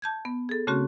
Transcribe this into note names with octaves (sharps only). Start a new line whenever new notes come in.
A5 G6 G#6
B3
G#4 A4
C#3 A3 C4 C#4 F#4